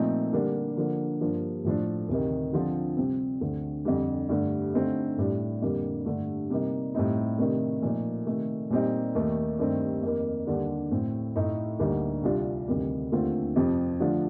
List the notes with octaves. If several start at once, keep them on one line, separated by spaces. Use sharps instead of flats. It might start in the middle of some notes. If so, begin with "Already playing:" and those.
Already playing: A#2 F3 A3 C4 D#4
D3 G3 A#3 D4
D3 F3 A#3
G2 F3 A#3 D4
A2 F3 A3 D4
D2 C3 D#3
D3 F3 C4 F4
C3 G3 C4
D2 D3 A3 C4
F2 D3 G3
G2 D3 A3
D3 A3 C4 D#4
A2 G3 D4
F2 D3 G3 A#3
G2 D3 A3
C3 G3 A#3 D#4
A2 G3 C4 D#4
C3 D#3 A3 D4
A#2 F3 A3 D#4
C3 D#3 A3
A#2 G3 C4 D#4
D#2 D#3 A3
G2 D#3 A3 C4
F2 D#3 A#3
D#2 D3 G3 D4
A2 A3 C4
A2 A3 D#4
D2 D3 G3 A#3 D#4
C2 C3 G3 D4 F4
D2 C3 D#3 G3
D#2 D3 A3 C4 F4
F2 C3 F3 C4
D3 F3 A3 D4 F4